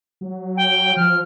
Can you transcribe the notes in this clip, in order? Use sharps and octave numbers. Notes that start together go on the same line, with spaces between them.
F#3
G5
F3 F6